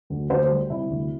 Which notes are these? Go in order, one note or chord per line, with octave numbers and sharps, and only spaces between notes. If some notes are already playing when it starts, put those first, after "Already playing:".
D2
D2 C5
G3
C3 E4
D2